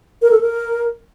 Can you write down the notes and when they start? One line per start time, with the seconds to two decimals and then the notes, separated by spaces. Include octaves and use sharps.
0.22 A#4
0.31 A4
0.41 A#4